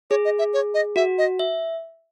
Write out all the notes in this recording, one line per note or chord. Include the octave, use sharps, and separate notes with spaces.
G#4 C#5
D#5
E5
C#5
D#5
F#4 E5
D#5
E5